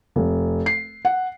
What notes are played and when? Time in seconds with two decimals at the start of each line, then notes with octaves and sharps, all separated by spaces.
0.16 F1
0.66 C7
1.05 F#5